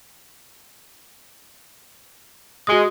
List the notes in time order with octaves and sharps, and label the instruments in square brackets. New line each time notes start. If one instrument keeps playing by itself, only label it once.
[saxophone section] G#3 [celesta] F#4 D#6